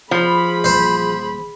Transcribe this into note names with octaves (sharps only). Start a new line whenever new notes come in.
F3 G#4 B5
D#1 E3 C5